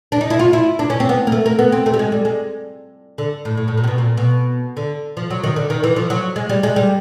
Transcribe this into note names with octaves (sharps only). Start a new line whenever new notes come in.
D4
D#4
E4
F4
E4
D4
C#4
C4
B3
A#3
A3
A#3
B3
C4
A3
G3
G#3
G3
G#3
D3
A2
A2
A2
A#2
C3
B2
A#2
B2
D3
F3
F#3
D#3
D3
D#3
E3
F3
F#3
G#3
G3
G#3
G3